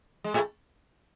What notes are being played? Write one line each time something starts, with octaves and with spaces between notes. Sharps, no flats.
G#3
A2 A3